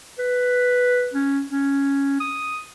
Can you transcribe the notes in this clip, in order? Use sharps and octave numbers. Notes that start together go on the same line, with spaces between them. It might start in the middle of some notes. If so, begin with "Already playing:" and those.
B4
C#4
C#4
D#6